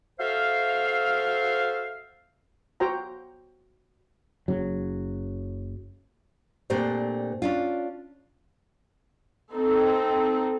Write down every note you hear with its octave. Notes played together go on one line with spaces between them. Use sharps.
F#4 A4 C5 E5 F5
F#4 C5 G5 A#5
F#1 C#3 F#3
A#2 A3 C4 D4 G4 C5
C#4 D4 F4
C4 D#4 A4